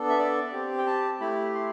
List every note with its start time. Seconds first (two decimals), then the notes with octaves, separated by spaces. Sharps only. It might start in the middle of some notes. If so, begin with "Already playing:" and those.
Already playing: B3 D4 A4
0.09 E5
0.19 D5
0.53 C4 G4
0.78 G5
0.87 A5
1.20 A3 E4 G4 B5
1.55 C6